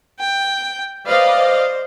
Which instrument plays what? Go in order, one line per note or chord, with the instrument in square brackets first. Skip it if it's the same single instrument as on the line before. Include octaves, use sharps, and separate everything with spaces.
[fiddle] G5
[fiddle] B4 C5 [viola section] D5 D#5 F5
[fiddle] C5